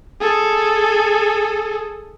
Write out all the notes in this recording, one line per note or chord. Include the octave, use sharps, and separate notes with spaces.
G#4 A4